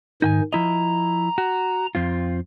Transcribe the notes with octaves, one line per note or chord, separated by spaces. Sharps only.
G#2 D#3 D#4 G5 G#5
F3 E4 D#5 A#5
F#4
F2 C4 F4